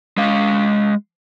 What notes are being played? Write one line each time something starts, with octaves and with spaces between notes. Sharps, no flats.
G#3 F5